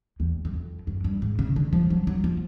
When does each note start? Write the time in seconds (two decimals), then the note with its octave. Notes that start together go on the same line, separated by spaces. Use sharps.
0.20 E2
0.45 F#2
0.54 F2
0.87 F#2
1.04 G2
1.22 G#2
1.39 C#3
1.56 D3
1.73 F3
1.90 F#3
2.07 F#3
2.24 F3